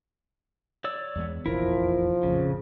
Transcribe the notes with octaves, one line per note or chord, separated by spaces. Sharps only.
C#5 D5 E6
E2 G#3 B3
F1 A#1 E2 F3 E4 A#4
A#1 F2 A2 C#3